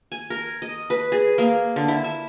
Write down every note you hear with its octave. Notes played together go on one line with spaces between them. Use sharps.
G#5
A#4
D#5
B4
G#4
A#3
D3
E4
E5